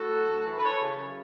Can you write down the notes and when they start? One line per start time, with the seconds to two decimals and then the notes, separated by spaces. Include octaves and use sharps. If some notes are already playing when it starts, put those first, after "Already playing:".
Already playing: A2 F#4 A4
0.11 F#3
0.28 D2
0.45 E3
0.57 B4
0.62 E3 A4 C#5
0.80 C#3
0.97 F#2